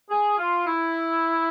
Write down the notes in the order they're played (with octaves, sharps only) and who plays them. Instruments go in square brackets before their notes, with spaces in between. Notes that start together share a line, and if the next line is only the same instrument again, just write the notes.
[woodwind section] G#4
F4
E4